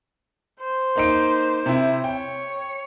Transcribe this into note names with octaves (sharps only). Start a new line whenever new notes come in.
C5
A#3 D#4 D7
C3 E4
C#5 G5